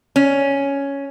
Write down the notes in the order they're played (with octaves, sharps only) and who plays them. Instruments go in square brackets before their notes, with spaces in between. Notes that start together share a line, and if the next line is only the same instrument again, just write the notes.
[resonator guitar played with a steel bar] C#4